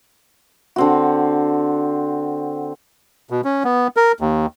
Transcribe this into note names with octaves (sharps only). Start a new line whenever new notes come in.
D3 C4 F#4
B2
C#4
B3
A#4
D#2